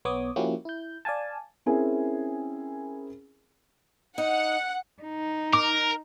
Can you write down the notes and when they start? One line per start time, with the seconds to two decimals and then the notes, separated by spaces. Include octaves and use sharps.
0.05 B1 B3 C#5 D6 D#6
0.36 F3 A#3 C#4 E4 F#4 G4
0.65 E4 G6
1.05 D5 F5 G#5 A5
1.66 C4 C#4 E4 G#4 A#4 G#5
4.18 D#4 F#5
5.03 D#4
5.53 A#4 D6